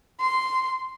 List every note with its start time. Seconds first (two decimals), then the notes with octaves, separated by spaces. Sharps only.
0.20 C6